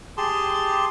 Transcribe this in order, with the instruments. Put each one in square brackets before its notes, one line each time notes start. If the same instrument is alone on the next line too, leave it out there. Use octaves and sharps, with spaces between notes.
[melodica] G4 G#4 A5 C6